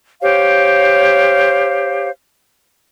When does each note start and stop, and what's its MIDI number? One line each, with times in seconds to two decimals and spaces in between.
0.22 2.09 67
0.22 2.09 72
0.22 2.09 73
0.22 2.09 77